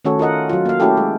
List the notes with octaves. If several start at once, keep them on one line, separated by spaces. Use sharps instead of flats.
D#3 A3 C#4 F#4 A4 C#5
F4 A#4 D#5 F#5
F#3 F4
A#3 F5
A3 C#4 E4 F#4 G4 A4
G#3